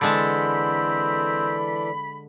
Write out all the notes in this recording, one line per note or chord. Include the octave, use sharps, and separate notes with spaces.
D3 E3 G#3 C4 A4 D5 A5 B5